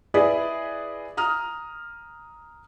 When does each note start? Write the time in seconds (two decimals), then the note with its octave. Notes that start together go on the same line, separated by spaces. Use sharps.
0.14 E4 G#4 B4 D5 D#5
1.17 A#5 D#6 F6